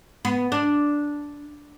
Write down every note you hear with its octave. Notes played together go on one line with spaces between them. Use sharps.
B3
D4